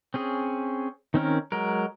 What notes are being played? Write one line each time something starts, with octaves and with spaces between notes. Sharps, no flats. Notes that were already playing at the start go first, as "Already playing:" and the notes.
C4 C#4 G#4
D#3 C4 C#4 A#4
F#3 G#3 A#4